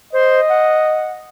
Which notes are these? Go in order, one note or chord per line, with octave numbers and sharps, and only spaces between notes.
C5 D#5
F#5